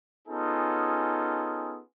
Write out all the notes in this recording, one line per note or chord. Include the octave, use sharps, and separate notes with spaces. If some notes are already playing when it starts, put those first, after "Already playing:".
B3 C#4 D#4 F4 G#4 A4